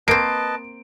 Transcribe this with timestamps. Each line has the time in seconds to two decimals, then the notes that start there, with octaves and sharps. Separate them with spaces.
0.08 A#3 C4 B4 D#5 A5 D7